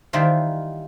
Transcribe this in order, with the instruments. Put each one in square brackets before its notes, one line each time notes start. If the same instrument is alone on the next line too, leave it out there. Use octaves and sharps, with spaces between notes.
[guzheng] D#3 E3 G3 F4 A#4 C5